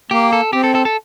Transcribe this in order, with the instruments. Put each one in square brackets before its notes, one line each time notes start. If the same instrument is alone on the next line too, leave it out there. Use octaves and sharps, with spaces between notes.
[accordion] A#3 [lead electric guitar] G4
[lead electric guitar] A4
[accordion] C4 [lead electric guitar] G4
[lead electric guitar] A4
A4
A4